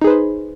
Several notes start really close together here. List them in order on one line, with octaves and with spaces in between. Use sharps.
D#4 G#4 B4 C5